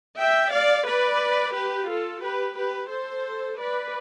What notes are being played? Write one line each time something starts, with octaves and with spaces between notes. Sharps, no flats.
E5 G5
D5 F5
B4 D5
G4 B4
F4 A4
G4 B4
G4 B4
A4 C5
B4 D5